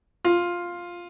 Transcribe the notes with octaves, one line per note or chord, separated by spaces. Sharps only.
F4